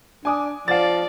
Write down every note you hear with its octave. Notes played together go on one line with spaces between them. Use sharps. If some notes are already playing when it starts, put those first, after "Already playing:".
D4 G#5 D6 D#6
F3 D5 F5 A6